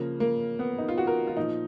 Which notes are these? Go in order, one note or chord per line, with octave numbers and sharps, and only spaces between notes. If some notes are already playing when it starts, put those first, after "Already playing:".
Already playing: C#3 F3 A#3
A#3
B3
D#4
F4
F#4
A#4
F4
A#2 F3 D#4